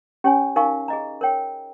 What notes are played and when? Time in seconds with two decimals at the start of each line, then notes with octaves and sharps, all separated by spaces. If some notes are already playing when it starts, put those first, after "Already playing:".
0.24 C#4 G4 C#5 G#5
0.56 D#4 A#4 F5 G#5 C#6
0.88 G#4 D#5 A#5
1.21 A#4 C#5 G5